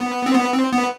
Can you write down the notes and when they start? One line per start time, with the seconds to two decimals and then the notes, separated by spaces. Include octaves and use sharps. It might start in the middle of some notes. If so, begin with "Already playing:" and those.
Already playing: B3
0.26 C4
0.34 B3
0.53 C4
0.73 B3